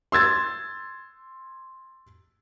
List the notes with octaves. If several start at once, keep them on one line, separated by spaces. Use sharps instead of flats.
C6 E6 G#6 A6